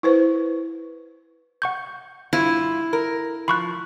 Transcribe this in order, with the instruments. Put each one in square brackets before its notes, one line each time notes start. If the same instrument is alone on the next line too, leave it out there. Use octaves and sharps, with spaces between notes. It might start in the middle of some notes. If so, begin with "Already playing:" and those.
[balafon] E4 B4 C5
[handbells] F#5 C#6 G6
[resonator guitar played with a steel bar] G2 F4 [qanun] E4
[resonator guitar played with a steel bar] A#4
[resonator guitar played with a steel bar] F3 [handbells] B5 C#6 F#6